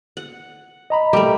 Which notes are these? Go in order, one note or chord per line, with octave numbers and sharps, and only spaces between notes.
F#5
D#5 A#5 B5
G3 A3 A#3